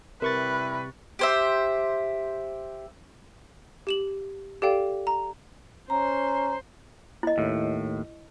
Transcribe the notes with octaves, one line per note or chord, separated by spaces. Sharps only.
C3 G3 E4 A#4 B4 B5 C#6 A6
G4 C5 E5
G4 E7 F#7
G4 A4 D5 F5 G5
A#5
C#4 C5 A#5
E4 D#5
D#2 A2